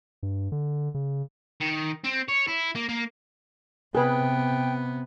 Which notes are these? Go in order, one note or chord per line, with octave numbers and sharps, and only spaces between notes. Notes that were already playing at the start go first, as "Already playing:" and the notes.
G2
D3
C#3
D#3
C4
C#5
E4
A#3
A#3
C3 B3 G#4 B4 G5